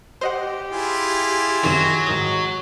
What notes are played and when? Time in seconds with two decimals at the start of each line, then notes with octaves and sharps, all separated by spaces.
0.21 G4 C5 D#5 F#5
0.71 E4 F4 G#4
1.64 F#2 C3 D#3 F#3
2.07 G#2 D#3 D#6